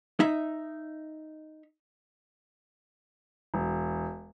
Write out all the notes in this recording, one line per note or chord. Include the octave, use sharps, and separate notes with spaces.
D#4 E5
E1